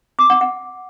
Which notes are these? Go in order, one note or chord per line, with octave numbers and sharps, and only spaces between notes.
D6
F#5
F#5